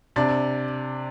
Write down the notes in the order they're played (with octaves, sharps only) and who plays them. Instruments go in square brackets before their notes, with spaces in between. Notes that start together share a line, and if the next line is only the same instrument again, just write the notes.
[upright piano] C3 [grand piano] D4 D5